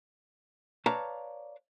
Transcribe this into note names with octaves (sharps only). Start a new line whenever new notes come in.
B4 C#5 D5 F5 A5 A#5